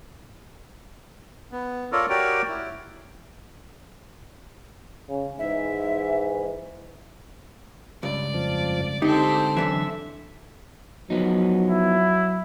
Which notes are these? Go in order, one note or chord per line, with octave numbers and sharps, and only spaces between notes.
B3
F4 A4 A#4 C#5 D5
F#4 G4 A#4 C#5 D5 G5
E4
C#3
G#2 E3 E5
C#2 G2 D5
F2 F3
G#2 D3 C4 D#4 G4 A4
F#2 D3 E3 E5
F3 F#3 B3 D#4
E4